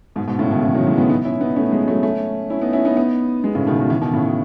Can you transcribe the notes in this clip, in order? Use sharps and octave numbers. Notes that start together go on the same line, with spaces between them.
G#2 B2
G#2 B2
A2 C#3
B2 D#3
C#3 E3
D#3 F#3
E3 G#3
G#3 B3
B3 D#4
C#4 E4
B3 D#4
A3 C#4
G#3 B3
F#3 A3
A3 C#4
C#4 E4
B3 D#4
C#4 E4
B3 D#4
B3 D#4
G#3 B3
A2 C#3
B2 D#3
B2 D#3
C#3 E3
B2 D#3
A2 C#3
B2